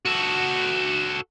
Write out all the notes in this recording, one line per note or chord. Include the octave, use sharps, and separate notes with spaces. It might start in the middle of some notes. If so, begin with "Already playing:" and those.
F#4 A4